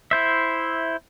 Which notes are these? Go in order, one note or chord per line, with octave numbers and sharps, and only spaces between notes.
E4 C5 E5